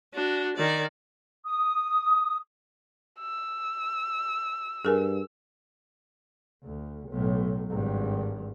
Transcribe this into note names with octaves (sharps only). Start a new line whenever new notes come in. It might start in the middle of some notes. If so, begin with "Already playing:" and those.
D4 F#4
D#3 D5
D#6
E6
G2 G#4 A#4 G#5
D2
B1 A2
G#1 G2